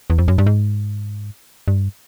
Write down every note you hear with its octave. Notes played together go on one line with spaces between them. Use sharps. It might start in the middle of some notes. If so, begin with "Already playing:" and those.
E2
F2
F#2
G2
G#2
G2